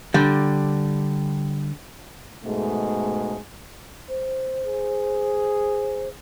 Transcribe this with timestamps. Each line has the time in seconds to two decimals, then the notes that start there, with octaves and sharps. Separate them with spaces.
0.14 D3 G3
2.45 G#2 B2 G#3 A3
4.09 C5
4.67 G#4